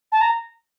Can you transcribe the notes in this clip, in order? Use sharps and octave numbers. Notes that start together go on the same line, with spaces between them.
A5
A#5